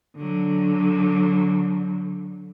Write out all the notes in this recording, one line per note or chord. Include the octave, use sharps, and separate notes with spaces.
D3 F#3